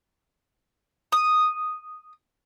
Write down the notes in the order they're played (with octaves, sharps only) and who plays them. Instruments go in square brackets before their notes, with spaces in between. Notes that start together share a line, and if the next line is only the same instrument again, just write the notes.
[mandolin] D#6